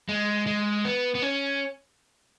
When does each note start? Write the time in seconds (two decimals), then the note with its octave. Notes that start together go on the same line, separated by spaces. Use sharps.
0.09 G#3
0.47 G#3
0.85 B3
1.15 B3
1.22 C#4